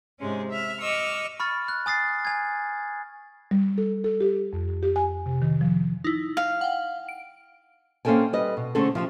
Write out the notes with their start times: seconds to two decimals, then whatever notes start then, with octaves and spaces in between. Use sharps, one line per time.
0.19 G#2 C3 G#3 C#4
0.51 E5 F6
0.81 D#5 C#6 D6 E6 F6
1.40 B5 C#6 F6 A6
1.68 F#6
1.86 G#5 D#6 A6 C7
2.25 G#5 G#6
3.51 G3
3.78 A4
4.04 A4
4.21 G4
4.53 F2
4.83 G4
4.96 G#5
5.26 C3
5.42 D#3
5.61 F3
6.04 D#4 E4
6.37 F5
6.61 F#5 G5
7.09 D7
8.05 A#3 C4 C#4 A4 G5 G#5
8.33 G3 B4 D#5
8.57 B2
8.75 D3 A3 C4 C#4 G#4 A4
8.95 F3 C4 G4